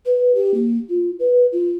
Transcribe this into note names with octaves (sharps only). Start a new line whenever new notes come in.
B4
G4
A#3
F4
B4
F4